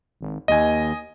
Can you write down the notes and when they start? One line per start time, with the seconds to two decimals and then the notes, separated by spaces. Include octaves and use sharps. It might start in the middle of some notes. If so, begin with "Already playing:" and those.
0.21 G#1
0.48 D#2 D#5 G#5